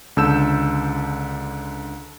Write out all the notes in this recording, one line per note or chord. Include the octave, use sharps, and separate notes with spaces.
C#2 D3 A5 E6 G6 E7